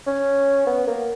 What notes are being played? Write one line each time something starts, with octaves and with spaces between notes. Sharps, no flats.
C#4
B3
A#3